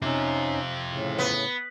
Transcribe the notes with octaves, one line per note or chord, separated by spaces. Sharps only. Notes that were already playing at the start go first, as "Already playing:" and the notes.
C3 C4 C#4 D#4 F4
A2 C#3
B3